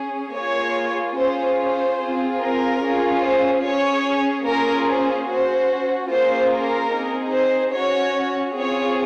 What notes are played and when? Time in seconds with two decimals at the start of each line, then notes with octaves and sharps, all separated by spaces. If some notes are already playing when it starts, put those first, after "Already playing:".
Already playing: C#4 G#4
0.36 A#3 F4 G#4 C#5
1.18 C#4 F4 G#4 C5
1.59 C5
2.00 C4 F4 G#4
2.41 A#4
2.82 C#4 F4 G#4
3.23 C5
3.64 C#4 G#4 C#5
4.46 A#3 C#4 F4 G#4 A#4
4.88 C5
5.28 C#4 F#4 C5
6.10 A#3 C#4 F4 G#4 C5
6.52 A#4
6.92 C4 D#4 G#4
7.34 C5
7.74 C#4 F#4 C#5
8.56 C4 F4 G#4 C#5